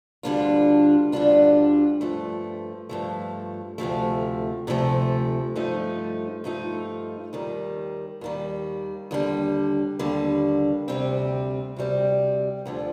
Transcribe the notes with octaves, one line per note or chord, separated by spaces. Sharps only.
D2 D3 G3 D4 F4
D2 D3 G3 D4 F4
G2 F3 A3
G2 F3 A3
D2 C3 F3 A3
D2 C3 F3 A3
G2 F3 A3 D#4
G2 F3 A3 D#4
D#2 D#3 G3
D#2 D#3 G3
D#2 D3 G3
D#2 D3 G3
D2 C3 G3 C4
D2 C3 G3 C4
D2 D3 F3